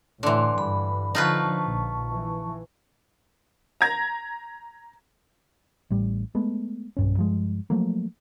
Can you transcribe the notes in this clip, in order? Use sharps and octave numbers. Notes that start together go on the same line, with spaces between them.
A2 D3 E3 C6
G2 B5
D3 F3 D#4 F4 B4 A5 C#6
A#1
E3
A#5 G#6 A#6
A1 A2 G3
G#3 A3 B3
B1 G2 C#4
G2 F3 G#3
F3 F#3 A3 A#3